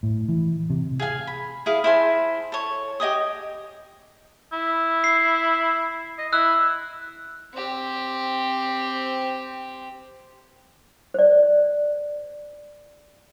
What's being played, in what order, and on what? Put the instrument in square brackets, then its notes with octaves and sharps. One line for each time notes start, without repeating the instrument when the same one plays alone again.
[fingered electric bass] A2
E3
C3
[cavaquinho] G#4 F5 G#5
B5
E4 G#4 F5
E4 C5 G#5 A5
A4 C#5
G4 D#5 G#5 D#6
[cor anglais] E4
[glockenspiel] C7
[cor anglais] D#5
[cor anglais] E4 [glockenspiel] E6 F#6
[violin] C4 G4
[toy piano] C5 D5